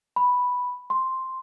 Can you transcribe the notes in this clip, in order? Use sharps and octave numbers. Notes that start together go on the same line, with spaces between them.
B5
C6